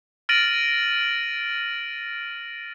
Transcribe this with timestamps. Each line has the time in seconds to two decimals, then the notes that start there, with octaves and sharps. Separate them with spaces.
0.29 F6 A6 A#6 D7 D#7 F#7